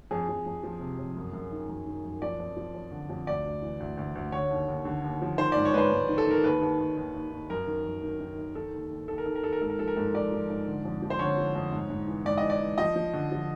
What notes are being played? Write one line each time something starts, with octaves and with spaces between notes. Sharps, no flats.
F2 G#4
F2
F2
F3
C3
F2
F#2
F#2
D#3
F#2
D#3
F#2
F3 D5
F2
F3
F2
D3
F2
D2 D5
D2
E3
D2
D2
D2
D3 C#5
D#2
D#2
D3
D#2
F3
D#3 C5
G#2 D5
C#5
G#2 B4 C5
G#2
D#3
A4
D#3 A#4
D#2 B4
D#2
D#2
D#2
D#2
D#2
F#2 A#4
D#3
F#2
D#3
D#3
D#3
D#3 A4
D#2
D#2
D#2 A4
A#4
D#3 A4
A#4
D#3 A4
A#4
G#2 A4
A#4
F3 A4
A#4
G#2 A4
F3 D5
F3
G#2
D3
F2
F3
C5
D3 C#5
F3
F2
G#2
G#2
E3
G#2 D5
E3 D#5
D5
E3
F3 D#5
F3
D3
F3